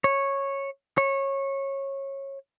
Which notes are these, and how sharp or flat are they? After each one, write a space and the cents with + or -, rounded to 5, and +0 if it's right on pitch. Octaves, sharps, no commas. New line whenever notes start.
C#5 -10
C#5 -20